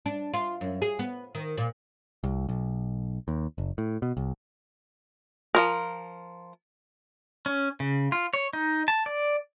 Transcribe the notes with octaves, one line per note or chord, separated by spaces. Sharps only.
D4
F4
F#2
G#4
B3
D#3
A#2
C2
B1
D#2
F#1
A2
B2
C2
F3 G#3 A#4
C#4
C#3
F4
C#5
D#4
A5
D5